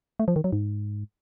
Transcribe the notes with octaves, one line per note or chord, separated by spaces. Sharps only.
A3
F3
D#3
F#3
G#2